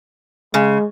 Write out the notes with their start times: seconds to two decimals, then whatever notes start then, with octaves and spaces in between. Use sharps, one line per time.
0.54 C#3 G#3